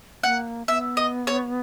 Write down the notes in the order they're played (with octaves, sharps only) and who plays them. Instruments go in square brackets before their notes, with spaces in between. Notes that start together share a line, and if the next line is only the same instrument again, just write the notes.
[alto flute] A#3 [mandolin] F#5
[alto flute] B3 [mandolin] E5
[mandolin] D#5
C#5